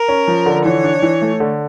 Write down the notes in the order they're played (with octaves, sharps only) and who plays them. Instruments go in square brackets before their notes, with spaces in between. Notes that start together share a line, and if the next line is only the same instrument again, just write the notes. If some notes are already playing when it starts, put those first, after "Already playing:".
Already playing: [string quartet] A#4
[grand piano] C#4
F3
D3
[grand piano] E3 [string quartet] C#5
[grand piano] D4
E3
A3
D3